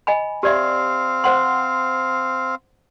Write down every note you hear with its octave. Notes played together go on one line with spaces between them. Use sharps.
D#5 G#5 B5
C4 G4 D5 E5 F5
C5 F#5 C6